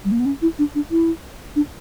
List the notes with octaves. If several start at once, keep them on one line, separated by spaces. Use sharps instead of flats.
G3
A#3
B3
C#4
E4
D4
D4
E4
D4